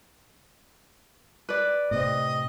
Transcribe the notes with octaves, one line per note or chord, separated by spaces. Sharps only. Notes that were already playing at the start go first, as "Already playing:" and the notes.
B4 D5
A2 C3 C4 D#5